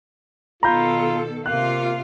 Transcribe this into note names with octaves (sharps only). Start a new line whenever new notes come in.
B2 D#3 F4 A4 A#5 B5 G6
C3 A#3 F4 F#6